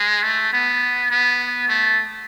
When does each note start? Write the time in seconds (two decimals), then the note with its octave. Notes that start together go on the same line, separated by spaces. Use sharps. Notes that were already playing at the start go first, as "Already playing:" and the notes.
Already playing: G#3
0.23 A3
0.53 B3
1.11 B3
1.69 A3